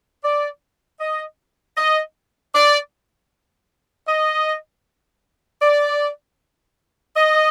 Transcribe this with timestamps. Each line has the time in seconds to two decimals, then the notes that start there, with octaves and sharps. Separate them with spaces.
0.24 D5
1.00 D#5
1.77 D#5
2.54 D5
4.08 D#5
5.62 D5
7.16 D#5